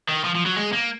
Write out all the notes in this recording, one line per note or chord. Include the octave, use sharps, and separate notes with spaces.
D#3
F3
F3
F#3
G#3
A#3